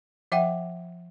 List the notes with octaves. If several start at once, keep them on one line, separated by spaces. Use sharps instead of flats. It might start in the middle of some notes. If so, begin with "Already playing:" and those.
F3 E5 F#5 G5